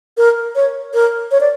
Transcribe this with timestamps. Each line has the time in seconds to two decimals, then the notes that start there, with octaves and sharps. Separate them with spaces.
0.18 A#4
0.56 C#5
0.94 A#4
1.32 C#5
1.41 D5